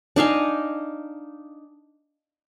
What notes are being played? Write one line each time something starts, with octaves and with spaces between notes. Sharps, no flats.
D4 D#4 F5 G#5